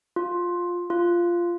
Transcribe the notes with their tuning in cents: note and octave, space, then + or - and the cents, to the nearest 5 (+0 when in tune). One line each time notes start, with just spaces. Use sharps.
F4 +10
F4 -10